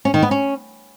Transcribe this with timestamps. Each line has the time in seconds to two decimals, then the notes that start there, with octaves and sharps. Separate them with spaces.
0.05 C#4
0.14 D#3
0.22 B3
0.31 C#4